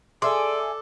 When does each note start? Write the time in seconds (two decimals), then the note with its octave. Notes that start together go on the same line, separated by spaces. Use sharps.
0.22 G#4 A4 D5 E5 C6